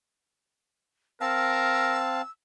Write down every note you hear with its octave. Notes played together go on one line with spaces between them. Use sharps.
C4 A#4 F5 A5 E6